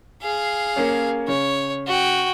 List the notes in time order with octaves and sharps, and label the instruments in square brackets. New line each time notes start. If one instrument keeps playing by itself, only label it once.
[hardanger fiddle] G#4 F5
[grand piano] A#3 C#4 C#5
[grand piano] C#3 [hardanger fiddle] C#5
[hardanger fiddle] F#4 G5